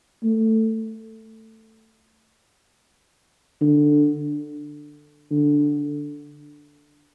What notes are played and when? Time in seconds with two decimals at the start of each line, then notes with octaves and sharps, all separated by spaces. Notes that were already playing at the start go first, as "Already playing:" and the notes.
0.23 A3
3.61 D3
5.31 D3